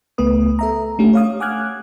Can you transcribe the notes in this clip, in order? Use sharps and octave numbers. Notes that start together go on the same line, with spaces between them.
C#2 A3 B3 B4 D#6
A4 E5 A#5
A3 C#4 D4 G4
C#5 F5 D#6
F#5 G#5 D6 F6 F#6 G#6